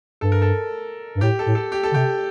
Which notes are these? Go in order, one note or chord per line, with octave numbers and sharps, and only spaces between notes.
G2 A4
A#4
A4
G2
A2 G4
A4
A2
A4
G4
A4
D3
C3 G4